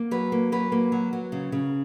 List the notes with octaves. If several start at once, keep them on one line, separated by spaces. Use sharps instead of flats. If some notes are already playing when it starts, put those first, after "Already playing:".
Already playing: A#3
F#3 B4
A#3
F#3 B4
A#3
F#3
F#3
C#3
C#3